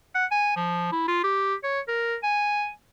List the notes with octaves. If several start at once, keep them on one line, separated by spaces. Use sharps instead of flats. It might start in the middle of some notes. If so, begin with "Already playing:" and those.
F#5
G#5
F3
E4
F4
G4
C#5
A#4
G#5